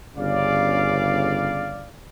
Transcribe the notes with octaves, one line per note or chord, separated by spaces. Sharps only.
G1 C#3 D5 F5